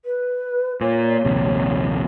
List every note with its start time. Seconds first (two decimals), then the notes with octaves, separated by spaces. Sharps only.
0.05 B4
0.81 A#2 C#5
1.25 A#1 D#2 C3